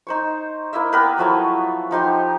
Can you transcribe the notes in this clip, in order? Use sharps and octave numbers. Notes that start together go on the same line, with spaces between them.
D#4 C5 C#6
A#3 E4 D#5 E5
B3 G4 A#4 B4
F3 F#3 A3 E4
F3 D#4 G4 C6